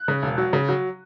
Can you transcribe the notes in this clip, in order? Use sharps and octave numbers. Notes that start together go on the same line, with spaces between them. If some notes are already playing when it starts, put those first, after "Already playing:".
Already playing: F#6
C#3
E1
F#3
C#3
F#3